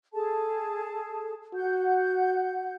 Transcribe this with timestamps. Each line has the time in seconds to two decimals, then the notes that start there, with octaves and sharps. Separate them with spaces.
0.13 G#4 A4 A5
1.54 F#4 F#5 G6